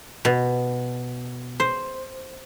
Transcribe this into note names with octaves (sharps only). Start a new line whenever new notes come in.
B2
C5